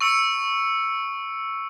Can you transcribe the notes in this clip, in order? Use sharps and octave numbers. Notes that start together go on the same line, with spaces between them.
C#6 E6 C#7 D7